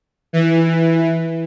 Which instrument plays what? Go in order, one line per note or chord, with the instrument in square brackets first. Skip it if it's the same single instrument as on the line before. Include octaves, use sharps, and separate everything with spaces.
[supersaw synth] E3